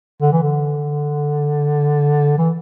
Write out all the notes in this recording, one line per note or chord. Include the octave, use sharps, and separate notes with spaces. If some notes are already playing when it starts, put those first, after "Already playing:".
D3
E3
D3
E3